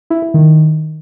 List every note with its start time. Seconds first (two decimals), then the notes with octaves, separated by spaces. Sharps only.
0.10 E4
0.22 E4
0.34 D#3